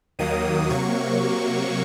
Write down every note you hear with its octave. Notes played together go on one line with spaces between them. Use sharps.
D#2 D#3 F#3 A#3 D#6
C3 F#3 A#3 C#6